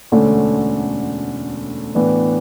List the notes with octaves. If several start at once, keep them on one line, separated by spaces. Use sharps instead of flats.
E1 D2 D3 A3 C#4
A2 E3 B3 D4